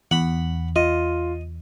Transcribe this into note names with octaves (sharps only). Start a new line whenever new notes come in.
E2 F#5 B5
F4 D#5